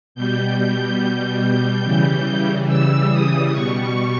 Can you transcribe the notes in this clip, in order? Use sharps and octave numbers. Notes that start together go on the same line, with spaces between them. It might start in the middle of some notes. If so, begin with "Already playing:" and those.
B2 G3 G6
G6
C#3 E3 G3
E6
D#6
B2 G3 C#6